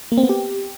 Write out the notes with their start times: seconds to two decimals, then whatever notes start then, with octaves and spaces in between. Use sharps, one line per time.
0.12 A#3
0.18 C4
0.23 B3
0.29 G4